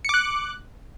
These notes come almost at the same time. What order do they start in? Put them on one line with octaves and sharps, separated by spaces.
C#7 D6 F#6